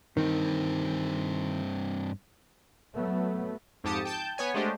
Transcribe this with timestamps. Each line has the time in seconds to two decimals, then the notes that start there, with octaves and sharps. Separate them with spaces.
0.17 G2 D#3 C4
2.93 F#3 A3 B3
3.84 F2 G#2 G4 A5 D#6 C#7
4.05 G5 A5 G6
4.38 B3 C#5 G#5
4.54 G#3 A3 D4 G4 C5 D#5